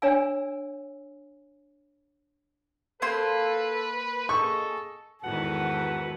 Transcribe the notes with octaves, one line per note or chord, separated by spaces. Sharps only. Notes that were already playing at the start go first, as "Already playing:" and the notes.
D4 C#5 D5 F#5 G#5 E6
A#3 A4 B4 C5 C6
G#4 A4 D#5 C#6
E2 G#2 D#3 F#4 A4 B4 F#5